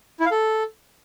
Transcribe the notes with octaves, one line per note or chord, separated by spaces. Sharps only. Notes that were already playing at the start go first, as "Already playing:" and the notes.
E4
F5
A4